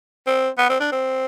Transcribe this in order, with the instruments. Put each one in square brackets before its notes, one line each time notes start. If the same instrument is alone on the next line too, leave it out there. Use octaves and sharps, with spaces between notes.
[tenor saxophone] C4
B3
C4
D4
C4